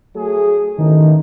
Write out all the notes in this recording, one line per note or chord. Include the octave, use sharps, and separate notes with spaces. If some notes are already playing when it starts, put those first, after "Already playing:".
F#3 A3 G#4
A1 D#3 D#4